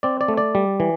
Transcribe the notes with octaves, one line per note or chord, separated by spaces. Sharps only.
C4 D5
D5
A3
D5
G3
E3